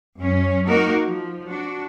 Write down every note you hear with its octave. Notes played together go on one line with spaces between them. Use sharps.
F#2 C#4
A#3 D#4 F#4 A#4
F3
D4 F#4